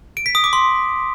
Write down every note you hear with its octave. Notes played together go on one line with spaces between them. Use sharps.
D7
B6
D#6
D6
C6